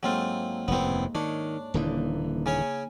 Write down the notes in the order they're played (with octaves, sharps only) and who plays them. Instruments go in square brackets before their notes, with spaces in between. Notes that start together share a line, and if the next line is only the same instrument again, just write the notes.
[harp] G#2 A#3 A4 [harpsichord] F#3 C4 F4
[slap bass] F1 D#2 A2 [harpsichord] B3 C4
[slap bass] D#3 [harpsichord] D4 [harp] C#5
[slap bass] D#1 D3 E3 [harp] A#3 D#4
[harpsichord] C#3 C#4 C#5 [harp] G#5